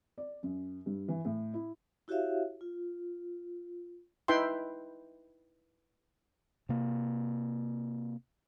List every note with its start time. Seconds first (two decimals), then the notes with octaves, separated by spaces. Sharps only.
0.18 D5
0.43 F#2
0.86 G2
1.08 E3
1.25 A2
1.54 E4
2.08 E4 F#4 G4 C#5 E5 F5
2.61 F4
4.28 D#4 E4 B4 E5 G5 C6
6.69 C3 A#3